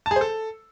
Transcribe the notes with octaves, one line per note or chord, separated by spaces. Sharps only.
A5
G#4
C5
A4